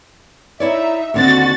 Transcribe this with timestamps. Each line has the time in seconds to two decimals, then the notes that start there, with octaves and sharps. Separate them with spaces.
0.60 D#4 E4 C#5 D5 E5
1.14 D#2 D3 C4 F#4 A6